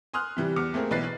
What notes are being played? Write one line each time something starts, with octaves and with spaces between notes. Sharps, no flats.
G#5 C6 D#6 F6 F#6
C3 E3 G3
E2 D6 F6 C#7
A3 A#3 C4 G#4 A#4
B1 E3 B4 F#6 A6 C7
F#6